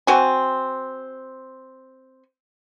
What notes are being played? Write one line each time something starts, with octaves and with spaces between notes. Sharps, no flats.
C4 F#4 G#5